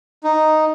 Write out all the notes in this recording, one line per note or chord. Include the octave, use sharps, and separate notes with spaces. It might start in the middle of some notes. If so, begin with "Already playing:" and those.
D#4